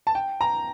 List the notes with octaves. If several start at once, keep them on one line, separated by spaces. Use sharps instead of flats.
A5
G5
A#5